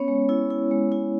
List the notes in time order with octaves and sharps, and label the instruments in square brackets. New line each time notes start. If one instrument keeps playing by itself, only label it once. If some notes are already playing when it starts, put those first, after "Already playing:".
Already playing: [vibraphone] B3 C#4 C#5
G#3
E4
E4
G#3
E4